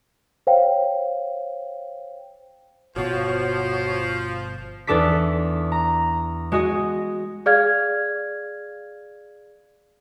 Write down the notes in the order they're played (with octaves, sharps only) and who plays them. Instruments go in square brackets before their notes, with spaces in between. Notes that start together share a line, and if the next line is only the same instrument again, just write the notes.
[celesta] C5 C#5 F5 G5
[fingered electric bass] G1 B2 B3 [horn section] F3 [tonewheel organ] F#4 C#5 [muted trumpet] C5
[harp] E2 D4 A4 D6 B6
A#5
G#3 F#4 D#5
[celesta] G#4 D5 F5 F6 G#6